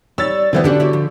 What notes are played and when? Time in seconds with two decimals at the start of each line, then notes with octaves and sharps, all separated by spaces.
0.18 G3 C#5 E6 A6
0.37 D5
0.53 B2 D3 E3 A3 B3 C4 C5
0.64 D3 B3 C#4 D4 F#4 G4
0.80 E4 F#4 C#5 D5
0.93 F3